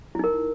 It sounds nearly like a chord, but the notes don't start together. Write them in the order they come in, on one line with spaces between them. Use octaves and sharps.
E4 D#4 A#4